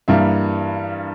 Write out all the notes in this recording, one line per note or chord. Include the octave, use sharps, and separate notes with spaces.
G2 E3 G3 A#3 E5